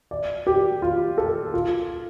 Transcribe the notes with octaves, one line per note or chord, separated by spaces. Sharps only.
D5
G4
F4
A4
F4